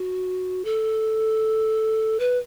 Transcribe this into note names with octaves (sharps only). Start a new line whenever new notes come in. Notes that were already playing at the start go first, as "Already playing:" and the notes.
Already playing: F#4
A4
B4